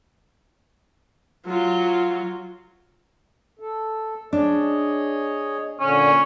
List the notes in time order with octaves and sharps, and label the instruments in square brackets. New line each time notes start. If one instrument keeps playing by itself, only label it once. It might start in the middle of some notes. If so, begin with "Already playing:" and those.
[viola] F#3 F4
[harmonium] A4
[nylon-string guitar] D4 [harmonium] G#4 C#5 D#5
[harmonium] A#2 D3 [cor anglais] C#4